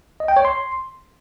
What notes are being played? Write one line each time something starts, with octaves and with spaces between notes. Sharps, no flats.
D#5
G5
C#5
C6